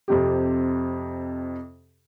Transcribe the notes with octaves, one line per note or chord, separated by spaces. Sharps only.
F2 C3 G4